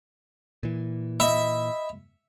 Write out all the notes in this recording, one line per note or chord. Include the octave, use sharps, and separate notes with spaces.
A#2 E3
D#5 E5 B5